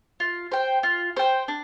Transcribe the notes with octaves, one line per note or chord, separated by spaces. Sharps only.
F4
C5 G5
F4
C5 G5
D4